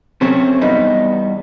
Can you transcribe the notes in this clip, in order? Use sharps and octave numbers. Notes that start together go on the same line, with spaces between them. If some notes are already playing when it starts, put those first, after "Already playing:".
C3 F#3 A3 C4 C#4
E2 G2 G3 B3 D#4